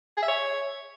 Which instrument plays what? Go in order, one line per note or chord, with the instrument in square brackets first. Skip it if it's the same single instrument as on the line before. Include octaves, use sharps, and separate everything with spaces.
[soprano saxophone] G#4
E5
C#5